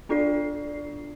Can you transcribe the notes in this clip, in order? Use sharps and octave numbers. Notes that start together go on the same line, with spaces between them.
B3 D4 F4 A4 D5 C7